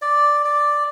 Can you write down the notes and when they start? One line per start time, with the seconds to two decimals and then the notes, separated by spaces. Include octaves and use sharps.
0.02 D5
0.45 D5